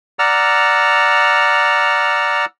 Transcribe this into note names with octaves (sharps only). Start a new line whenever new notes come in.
D5 F#5 A#5 E6 F6